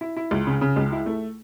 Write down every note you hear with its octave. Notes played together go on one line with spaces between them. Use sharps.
E4
E4
C#2
C#3
C#3
C#2
E4
A3